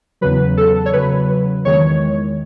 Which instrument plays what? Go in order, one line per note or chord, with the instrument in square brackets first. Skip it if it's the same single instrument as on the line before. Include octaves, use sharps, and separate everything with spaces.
[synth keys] E2 C#3 F#3 B4
A4
C#5
E2 C#3 F#3 B4
E2 D#3 G#3 C#5